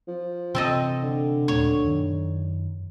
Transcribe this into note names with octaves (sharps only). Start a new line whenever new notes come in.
F3
C3 E3 C4 A4 D#5
D3
D#2 A#2 A3 C#5
F#2 D#3